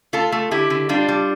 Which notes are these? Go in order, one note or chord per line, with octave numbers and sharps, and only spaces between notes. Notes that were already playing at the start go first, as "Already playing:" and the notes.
A3 F4 A4
A3
D3 E4 G4
D3
G3 D4 F4
G3